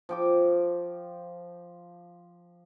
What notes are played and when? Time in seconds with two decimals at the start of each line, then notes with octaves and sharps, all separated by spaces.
0.09 F3 G5 D6